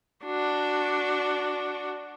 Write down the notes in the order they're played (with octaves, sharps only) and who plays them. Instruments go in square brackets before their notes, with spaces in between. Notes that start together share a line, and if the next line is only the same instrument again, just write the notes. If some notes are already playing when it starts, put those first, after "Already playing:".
[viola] D4 F#4